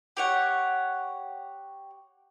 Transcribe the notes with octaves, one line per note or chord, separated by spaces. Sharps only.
G4 C#5 F#5